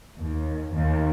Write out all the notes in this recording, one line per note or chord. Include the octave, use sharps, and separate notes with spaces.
D#2
D#2